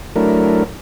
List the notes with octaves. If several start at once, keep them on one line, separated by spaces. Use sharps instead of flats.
F#3 A3 D4 E4 A#4